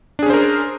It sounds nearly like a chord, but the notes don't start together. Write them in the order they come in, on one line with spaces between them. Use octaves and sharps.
D4 G#4 C#4 C5 A#4